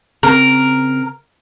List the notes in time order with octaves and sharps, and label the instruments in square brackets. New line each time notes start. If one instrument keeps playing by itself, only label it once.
[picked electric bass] C#3 C4 [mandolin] A#4